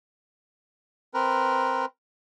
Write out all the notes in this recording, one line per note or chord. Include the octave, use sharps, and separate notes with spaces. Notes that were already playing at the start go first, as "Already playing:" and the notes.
C4 A#4 B4